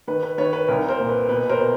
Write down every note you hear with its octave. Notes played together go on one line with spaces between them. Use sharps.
D#3 B4
B4
D#3 B4 C#5
B4
C2 A#4
A#4 C5
A#2
B4
B2 B4
A#4 C5
B2